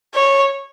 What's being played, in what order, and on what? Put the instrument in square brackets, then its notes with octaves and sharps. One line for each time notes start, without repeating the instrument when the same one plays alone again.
[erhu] C#5